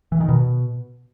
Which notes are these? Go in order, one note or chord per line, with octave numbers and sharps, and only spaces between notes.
E3
D#3
B2